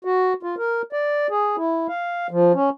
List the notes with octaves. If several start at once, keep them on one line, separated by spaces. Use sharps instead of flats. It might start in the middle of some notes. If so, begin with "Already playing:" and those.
F#4
F4
A#4
D5
G#4
E4
F5
F3
C#4